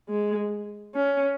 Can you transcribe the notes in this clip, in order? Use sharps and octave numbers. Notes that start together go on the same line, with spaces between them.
G#3
C#4